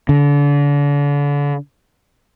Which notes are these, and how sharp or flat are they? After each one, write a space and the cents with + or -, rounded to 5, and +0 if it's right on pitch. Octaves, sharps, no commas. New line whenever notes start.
D3 -35